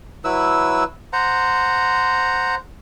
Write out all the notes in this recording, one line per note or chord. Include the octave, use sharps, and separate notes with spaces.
F#3 E4 B4 E6
C5 F#5 A#5